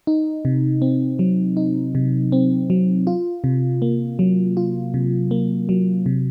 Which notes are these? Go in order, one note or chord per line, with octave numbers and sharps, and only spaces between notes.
D#4
C3
C4
F#3
D#4
C3
C4
F#3
F4
C3
A#3
F#3
F4
C3
A#3
F#3
C3